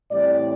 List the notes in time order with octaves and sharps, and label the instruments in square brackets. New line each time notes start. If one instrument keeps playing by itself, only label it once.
[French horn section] A2 E3 G3 C4 D5